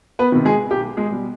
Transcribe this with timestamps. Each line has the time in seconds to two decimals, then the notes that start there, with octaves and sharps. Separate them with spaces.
0.19 B3 B4
0.32 C3 D#3
0.45 G#3 G#4
0.71 B1 G4
0.97 G#3 G#4
1.10 B2 G3